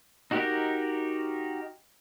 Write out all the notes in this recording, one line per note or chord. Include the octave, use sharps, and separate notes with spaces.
D#4 F#4 G4 A#4